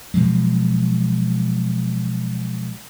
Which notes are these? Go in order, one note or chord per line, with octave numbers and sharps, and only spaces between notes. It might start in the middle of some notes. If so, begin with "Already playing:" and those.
B2 F3 F#3 G#3